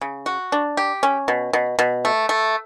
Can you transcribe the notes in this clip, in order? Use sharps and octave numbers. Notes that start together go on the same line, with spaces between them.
C#3
F#4
D4
G4
C#4
B2
B2
B2
A3
A3